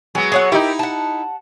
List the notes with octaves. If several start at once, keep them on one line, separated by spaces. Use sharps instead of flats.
F#3 G#3 B3
G#4 C#5 F#5
D#4 E4 G4 A#4
F#5 A5